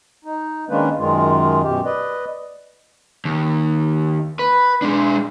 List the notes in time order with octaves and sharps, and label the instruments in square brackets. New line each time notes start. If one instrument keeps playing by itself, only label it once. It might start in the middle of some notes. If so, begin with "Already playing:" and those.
[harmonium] D#4
D#3 G#3 A#3 C#4 D4 B4
F#2 D#3 G#3 F4
F#2 B2 G4
B4 D5 D#5
[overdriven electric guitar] D#2
B4
G#3 D4